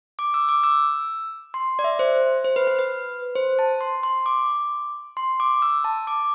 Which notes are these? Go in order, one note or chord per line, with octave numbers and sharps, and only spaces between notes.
D6
E6
D6
E6
C6
D5
E5
C5
C5
B4
B4
B4
C5
A5
C6
C6
D6
C6
D6
E6
A5
D6